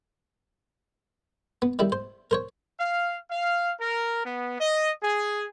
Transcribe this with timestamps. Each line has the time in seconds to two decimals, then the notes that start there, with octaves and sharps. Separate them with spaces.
1.62 B3
1.79 D#3 G3 E4
1.92 C5
2.31 A#4 C5 C#5
2.79 F5
3.30 F5
3.79 A#4
4.25 B3
4.59 D#5
5.02 G#4